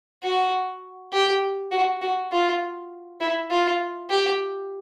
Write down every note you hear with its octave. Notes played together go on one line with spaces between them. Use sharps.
F#4
G4
F#4
F#4
F4
E4
F4
G4